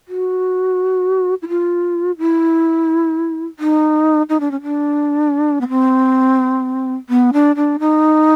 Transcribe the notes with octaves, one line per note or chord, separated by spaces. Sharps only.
F#4
E4
F4
E4
D#4
D#4
D4
C#4
D4
B3
C4
B3
D4
D4
D#4